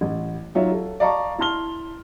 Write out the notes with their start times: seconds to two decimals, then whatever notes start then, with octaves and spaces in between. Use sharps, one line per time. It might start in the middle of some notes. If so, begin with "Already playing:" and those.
0.01 A1
0.55 F#3 D#4 F4 C#5 E5
0.72 A4
1.00 D5 D#5 F5 A5 A#5 C#6
1.38 E4 A5 C6 F6 G7